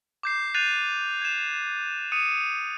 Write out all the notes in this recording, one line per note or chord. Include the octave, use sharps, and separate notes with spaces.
D6 G6 C7
F#6 G6 A6 C7 D#7 F7
G#6 E7
D#6 C#7 D#7